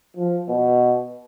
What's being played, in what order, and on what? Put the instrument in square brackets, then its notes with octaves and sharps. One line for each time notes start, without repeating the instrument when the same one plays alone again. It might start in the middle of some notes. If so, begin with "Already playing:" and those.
[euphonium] F3
B2